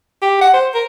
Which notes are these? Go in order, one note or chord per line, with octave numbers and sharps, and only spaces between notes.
G4
F#5
C5
A#4